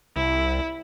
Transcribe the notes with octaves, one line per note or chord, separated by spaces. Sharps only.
C2 E4